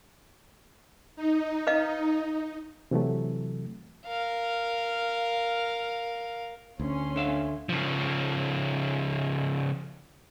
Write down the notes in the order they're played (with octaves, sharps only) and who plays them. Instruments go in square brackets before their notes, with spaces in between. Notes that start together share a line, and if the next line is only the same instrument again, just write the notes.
[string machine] D#4
[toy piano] B4 D#5 F5
[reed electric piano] C3 E3 F#3 A3
[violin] A#4 F5
[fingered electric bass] D2 [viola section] C#4 C6
[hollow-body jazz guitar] D3 E5 F5
[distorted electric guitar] C#3 F3